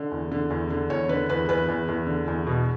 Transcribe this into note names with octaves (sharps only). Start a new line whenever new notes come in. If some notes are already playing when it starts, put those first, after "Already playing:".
Already playing: D3
E2
D3
E2
D3
E2 C#5
D3 B4
E2 B4
E2 B4
E2
E2
D3
E2
B2